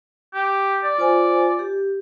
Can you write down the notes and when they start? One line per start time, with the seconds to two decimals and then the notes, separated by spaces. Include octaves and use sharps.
0.34 G4
0.84 D5
0.98 F4 C5 G#5
1.59 G4